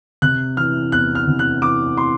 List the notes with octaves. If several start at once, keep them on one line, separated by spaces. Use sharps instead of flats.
C3 F#6
E3 F6
E2 F#6
F6
C3
F#6
E3 D6
C6